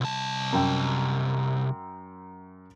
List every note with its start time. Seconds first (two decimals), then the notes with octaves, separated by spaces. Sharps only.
0.01 C2 A5
0.53 F#2 G5